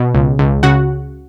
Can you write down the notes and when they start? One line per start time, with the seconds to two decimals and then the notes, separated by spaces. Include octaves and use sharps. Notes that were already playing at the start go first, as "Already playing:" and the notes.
Already playing: B2
0.14 C#2
0.39 C#2
0.63 C#3 F#4 F#5